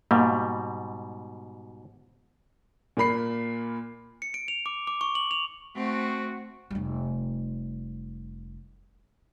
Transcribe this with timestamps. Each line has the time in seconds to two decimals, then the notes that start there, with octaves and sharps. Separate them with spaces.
0.11 G#2 B2 G3 A#3
2.97 A#2 A#3 B5 C7
4.22 C#7
4.34 D7
4.48 F7
4.66 D6
4.87 D6
5.01 C#6
5.15 F#7
5.31 F7
5.76 A3 C4 F#4
6.70 F1 G3